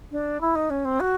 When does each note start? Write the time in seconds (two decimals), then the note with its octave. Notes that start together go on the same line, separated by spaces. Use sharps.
0.11 D4
0.40 E4
0.55 D#4
0.70 C#4
0.84 C4
1.00 F#4